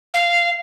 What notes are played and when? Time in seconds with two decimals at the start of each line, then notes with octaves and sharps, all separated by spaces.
0.14 F5